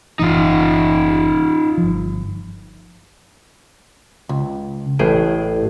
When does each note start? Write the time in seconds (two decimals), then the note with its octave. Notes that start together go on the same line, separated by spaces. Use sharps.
0.19 F#1 A2 E3 D#4 F4
1.78 G1 F3
4.29 C#2
4.99 A1 A2 G#4 G5